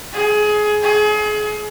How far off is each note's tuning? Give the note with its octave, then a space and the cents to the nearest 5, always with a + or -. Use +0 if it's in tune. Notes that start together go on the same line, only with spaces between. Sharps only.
G#4 +20
G#4 +30